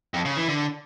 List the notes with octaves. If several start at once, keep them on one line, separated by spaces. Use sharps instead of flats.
F2
C#3
E3
D3